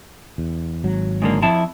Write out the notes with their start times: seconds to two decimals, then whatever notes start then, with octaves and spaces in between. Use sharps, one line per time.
0.38 E2
0.84 G#1 F#3
1.22 G#2 D3 A#3
1.42 F2 E4 A5